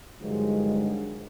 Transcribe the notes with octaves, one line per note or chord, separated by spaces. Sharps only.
G2 D3 D#3 F3 F#3 G#3